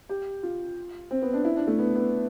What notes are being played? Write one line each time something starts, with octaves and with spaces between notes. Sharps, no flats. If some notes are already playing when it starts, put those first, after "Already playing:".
G4
F4
C4
B3
D4
E4
D4
A3
B3
B3